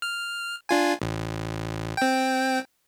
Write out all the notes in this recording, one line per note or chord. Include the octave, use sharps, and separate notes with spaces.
F6
D4 F4 G#5
A1
C4 G5